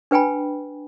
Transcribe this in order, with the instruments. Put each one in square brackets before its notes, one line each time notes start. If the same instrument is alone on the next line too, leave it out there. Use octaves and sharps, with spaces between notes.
[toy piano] D4 B4 G5 G#5 B5